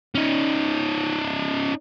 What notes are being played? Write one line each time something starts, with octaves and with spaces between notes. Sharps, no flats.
C#4 D#4